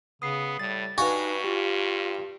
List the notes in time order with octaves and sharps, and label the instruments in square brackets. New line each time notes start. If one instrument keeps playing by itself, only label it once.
[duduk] C#3 [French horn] B3 [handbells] D#6 C7
[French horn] A2 [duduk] G3 [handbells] A6
[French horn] G2 [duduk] D#4 [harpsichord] F#4 [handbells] B4 F5 G#5
[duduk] F4 [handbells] G4